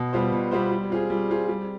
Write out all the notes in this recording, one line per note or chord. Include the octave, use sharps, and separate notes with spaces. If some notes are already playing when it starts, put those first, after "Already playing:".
Already playing: B2
G3 B3 F4 C5
B2
G3 B3 F4 C5
G3
C4 F4 G#4
G3
C4 F4 G#4
G3